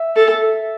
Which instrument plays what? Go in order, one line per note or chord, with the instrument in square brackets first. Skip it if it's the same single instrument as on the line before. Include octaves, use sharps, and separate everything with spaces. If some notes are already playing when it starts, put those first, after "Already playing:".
Already playing: [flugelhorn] E5
[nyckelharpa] A4